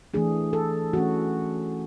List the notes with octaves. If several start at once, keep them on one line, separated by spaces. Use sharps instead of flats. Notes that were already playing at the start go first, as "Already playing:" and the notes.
E3 A3 D4 G#4
A4
E3 A3 C#4 F#4